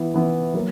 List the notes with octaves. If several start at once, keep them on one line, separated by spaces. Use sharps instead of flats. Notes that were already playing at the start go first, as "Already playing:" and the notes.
Already playing: E3 B3 E4
E3 B3 E4
F#3 A#3